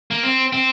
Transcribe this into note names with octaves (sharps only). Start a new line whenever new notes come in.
A#3
C4
C4